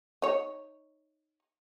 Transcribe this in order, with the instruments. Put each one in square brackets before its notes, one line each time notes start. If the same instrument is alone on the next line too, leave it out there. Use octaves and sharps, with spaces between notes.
[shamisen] D#4 C#5